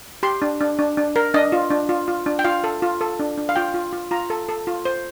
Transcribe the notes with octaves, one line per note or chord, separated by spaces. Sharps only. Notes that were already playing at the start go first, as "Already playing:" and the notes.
G4 C6
D4
D4
D4
D4
A#4
D4 D#5
F4
D4
F4
F4
D4
G5
F4 F5
A4
F4
A4
D4
D4
F5
F4 G5
F4
F4
F4 A#5
A4
A4
F4
C5